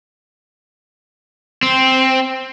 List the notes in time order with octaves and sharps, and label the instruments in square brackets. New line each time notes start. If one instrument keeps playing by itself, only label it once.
[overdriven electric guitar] C4